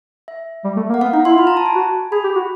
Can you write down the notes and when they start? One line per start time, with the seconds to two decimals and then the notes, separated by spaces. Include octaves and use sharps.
0.28 E5
0.64 G3
0.77 A3
0.90 A#3
0.94 F#5
1.01 B3 F5
1.13 D#4 F#5
1.25 E4 C6
1.38 F4 B5
1.47 A#5
1.57 A5
1.66 G#5
1.75 F#4
2.12 G#4 B5
2.24 G4
2.36 F#4